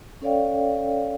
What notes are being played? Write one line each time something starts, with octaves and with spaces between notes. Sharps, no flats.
C#4 A4 C#5 D5 F5 G5